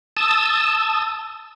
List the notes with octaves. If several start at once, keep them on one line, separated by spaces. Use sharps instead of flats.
A5 D#6 E6